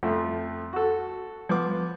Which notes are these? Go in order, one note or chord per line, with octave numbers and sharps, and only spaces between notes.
F2 F3 A3
F#4 A4
F3 B3 D6